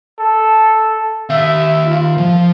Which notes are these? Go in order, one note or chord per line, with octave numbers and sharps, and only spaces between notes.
A4
D#3 E5 F5
F4
F3